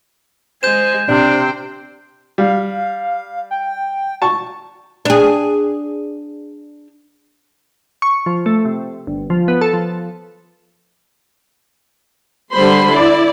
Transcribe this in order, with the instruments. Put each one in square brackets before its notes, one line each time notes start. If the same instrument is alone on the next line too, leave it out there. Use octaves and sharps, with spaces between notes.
[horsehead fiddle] G#3 G#5 [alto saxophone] C5 [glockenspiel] G6 E7
[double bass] C3 [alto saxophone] D4 [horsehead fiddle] C5 G5
[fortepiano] G3 [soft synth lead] F5
[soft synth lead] G5
[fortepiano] A5 C#6
[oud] D4 G#4
[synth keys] C#6
F3
A3
C3
G1
F3
B3
A4
F3
[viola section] D3 G3 C5 B5 C6
E4 D5